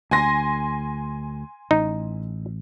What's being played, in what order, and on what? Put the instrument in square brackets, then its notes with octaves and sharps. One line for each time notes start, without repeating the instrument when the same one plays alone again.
[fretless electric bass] D2 [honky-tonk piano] G#5 C6 A#6
[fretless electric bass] A1 [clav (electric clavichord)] D#4